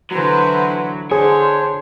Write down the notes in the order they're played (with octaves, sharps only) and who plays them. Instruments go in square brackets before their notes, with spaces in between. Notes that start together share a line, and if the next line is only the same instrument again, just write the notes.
[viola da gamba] D3 E3 E4 [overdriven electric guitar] F#3 [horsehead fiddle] B4 C5
[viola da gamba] D3 [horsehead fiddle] D4 C5 [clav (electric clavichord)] G#4 [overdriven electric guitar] C#5